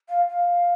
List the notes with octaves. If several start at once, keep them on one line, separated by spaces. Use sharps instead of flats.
F5
F5